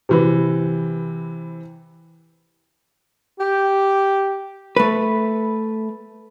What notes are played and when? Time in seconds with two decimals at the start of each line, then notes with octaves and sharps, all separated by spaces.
0.09 C3 E3 B4
3.40 G4
4.77 A3 B4